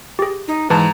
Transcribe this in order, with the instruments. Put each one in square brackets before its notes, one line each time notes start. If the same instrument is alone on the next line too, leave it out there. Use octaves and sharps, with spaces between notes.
[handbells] G4 G#4
[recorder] D#4
[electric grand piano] G#2 [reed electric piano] E3 [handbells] B4 A5 [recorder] A#5